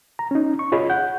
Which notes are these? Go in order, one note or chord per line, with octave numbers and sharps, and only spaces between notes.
A#5
C#4 D#4
C#6
F4 G#4 C#5 D#5 B5
F#5 G6